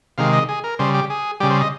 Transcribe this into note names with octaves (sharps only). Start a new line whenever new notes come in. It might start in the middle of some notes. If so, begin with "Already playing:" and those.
C3 D#3 G#3 F5
D#5
G#4
A#4
C#3 G3 C5
G4
G#4
C#3 G3 G4
C5
D#5